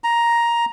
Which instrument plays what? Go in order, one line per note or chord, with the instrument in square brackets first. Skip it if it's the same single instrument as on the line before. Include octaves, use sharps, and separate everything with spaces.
[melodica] A#5